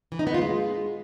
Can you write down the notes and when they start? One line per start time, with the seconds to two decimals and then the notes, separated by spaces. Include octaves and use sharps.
0.12 E3
0.19 D#4
0.27 B3
0.34 F4
0.42 G#3